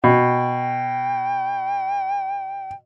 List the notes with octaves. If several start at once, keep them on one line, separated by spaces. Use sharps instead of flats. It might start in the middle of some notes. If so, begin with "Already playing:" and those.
B2 G5